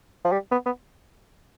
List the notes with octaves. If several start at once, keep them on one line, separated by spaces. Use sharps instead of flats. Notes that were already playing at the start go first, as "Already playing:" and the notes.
F3
G3
B3
B3